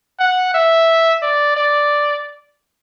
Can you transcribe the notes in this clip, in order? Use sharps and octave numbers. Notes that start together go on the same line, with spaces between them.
F#5
E5
D5
D5